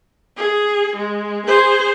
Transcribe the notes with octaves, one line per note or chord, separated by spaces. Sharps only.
G#4
G#3
G#4 C5